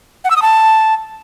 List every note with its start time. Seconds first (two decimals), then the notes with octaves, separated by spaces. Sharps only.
0.25 F#5
0.30 E6
0.36 D#6
0.42 A5